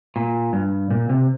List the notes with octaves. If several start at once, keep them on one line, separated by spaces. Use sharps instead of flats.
A#2
G2
A#2
C3